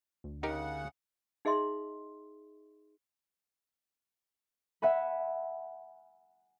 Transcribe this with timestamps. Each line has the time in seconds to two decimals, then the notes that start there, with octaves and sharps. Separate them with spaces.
0.24 D2
0.43 C#3 D#4 G4 A#4 F#5
1.45 D#4 G#4 D#5 E5 C6
4.82 E5 F#5 G#5 B5